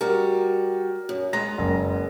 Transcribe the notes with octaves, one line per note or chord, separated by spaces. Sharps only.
G3 F#4 A#4
F#2
G#3 B3 A#5 A#6
F#1